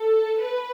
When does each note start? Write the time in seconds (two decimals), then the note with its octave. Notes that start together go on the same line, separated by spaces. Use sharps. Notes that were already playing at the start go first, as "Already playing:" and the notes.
Already playing: A4
0.40 B4